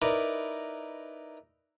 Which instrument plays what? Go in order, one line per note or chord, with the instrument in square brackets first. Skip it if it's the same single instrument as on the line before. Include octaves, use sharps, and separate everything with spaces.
[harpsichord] D#4 E4 A#4 B4 D5